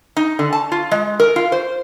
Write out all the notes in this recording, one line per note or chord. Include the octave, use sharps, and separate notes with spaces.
D#4
D3
A5
F4
G#3
A#4
F4
C5